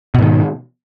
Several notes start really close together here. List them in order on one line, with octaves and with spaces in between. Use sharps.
B2 G#2 D#3